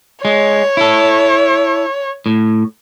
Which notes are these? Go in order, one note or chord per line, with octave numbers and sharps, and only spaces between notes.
G#3 C#5
E4 A4
A2